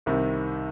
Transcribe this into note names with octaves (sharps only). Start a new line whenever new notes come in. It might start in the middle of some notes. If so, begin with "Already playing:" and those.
C2 C3 D#3